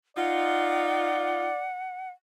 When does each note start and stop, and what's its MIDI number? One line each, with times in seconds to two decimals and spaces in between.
0.17 1.48 63
0.17 1.48 65
0.17 1.68 74
0.17 2.10 78